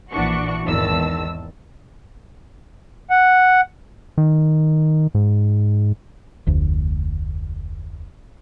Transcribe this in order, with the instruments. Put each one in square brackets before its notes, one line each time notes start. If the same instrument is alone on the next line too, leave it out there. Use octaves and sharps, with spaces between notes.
[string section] A#1 E3 D4 F#4 C#6
G#1 E2 G#2 D#3 A5 E6
[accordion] F#5
[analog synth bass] D#3
G#2
[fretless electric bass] F1 D2